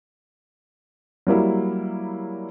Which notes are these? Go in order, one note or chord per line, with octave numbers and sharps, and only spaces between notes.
F#3 G3 A#3 E4